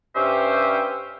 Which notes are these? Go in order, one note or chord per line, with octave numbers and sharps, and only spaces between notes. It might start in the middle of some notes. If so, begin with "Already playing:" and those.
G2 G3 C#4 G4 C5 E5